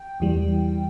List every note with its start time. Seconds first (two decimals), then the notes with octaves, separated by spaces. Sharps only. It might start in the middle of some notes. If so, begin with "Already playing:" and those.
Already playing: G5
0.20 E2 E3 G3